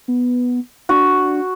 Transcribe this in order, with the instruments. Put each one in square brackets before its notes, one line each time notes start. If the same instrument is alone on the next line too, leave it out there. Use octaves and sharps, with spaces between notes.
[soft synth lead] B3
[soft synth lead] D4 [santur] F#4